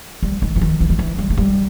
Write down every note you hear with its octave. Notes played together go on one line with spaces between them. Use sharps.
G3
D#3
E3
D#3
E3
D#3
E3
G3
G#3
G3